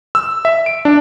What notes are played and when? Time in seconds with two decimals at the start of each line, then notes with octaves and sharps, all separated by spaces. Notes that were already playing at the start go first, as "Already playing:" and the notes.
0.15 E6
0.45 E5
0.66 D7
0.85 D4